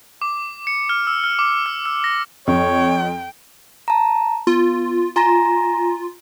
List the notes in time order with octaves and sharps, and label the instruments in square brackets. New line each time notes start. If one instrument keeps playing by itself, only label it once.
[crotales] D6
C#7
F6
E6
F6
D6
E6
E6
A#6
[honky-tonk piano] F2 [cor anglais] C#5 [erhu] G5
[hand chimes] A5 A#5
[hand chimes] B3 [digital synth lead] F4
[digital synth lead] F4 [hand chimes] G#5 A#5 A#6